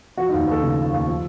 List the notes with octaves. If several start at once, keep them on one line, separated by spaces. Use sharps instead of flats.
F3 F#4
D#4
D#2
D#4
D#2 A4
C#3
F3
D#2
F3